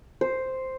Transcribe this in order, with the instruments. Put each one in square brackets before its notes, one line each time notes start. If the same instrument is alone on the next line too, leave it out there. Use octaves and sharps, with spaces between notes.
[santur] C5